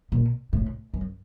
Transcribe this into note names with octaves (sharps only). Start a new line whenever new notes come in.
A#2
A2
F#2